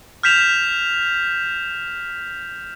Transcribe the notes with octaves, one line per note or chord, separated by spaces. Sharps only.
F6 G6 B6 E7 F7